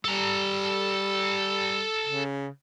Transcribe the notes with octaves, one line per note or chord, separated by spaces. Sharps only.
G3 A4 A#5
C#3